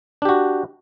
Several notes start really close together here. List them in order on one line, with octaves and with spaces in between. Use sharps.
D4 G4 F#4